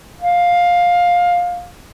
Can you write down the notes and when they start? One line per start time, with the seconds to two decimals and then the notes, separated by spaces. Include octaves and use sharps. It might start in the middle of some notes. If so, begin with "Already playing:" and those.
0.21 F5